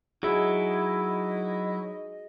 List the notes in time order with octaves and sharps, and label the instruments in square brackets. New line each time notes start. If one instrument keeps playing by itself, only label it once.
[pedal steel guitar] F#3 E4 [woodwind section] G#3 D#4 D#5 [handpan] F#4 G#4